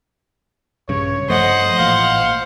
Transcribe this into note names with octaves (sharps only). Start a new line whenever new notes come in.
A#1 G2 C#3 C#5
G2 F3 A3 C5 D#5 F#5
A1 A#2 F5